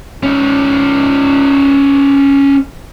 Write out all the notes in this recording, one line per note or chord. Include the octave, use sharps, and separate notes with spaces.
C#4 D#4